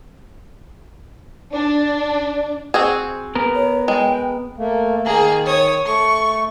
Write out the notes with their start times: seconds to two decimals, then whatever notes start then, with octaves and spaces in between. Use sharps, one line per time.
1.53 D4
2.74 C4 F#4 G#4
3.35 B3 A#4
3.55 C#5
3.88 G#3 G5
4.58 A3 A#3
5.05 D#3 A#3 G#4
5.45 C#5 D#6
5.86 A3 C#6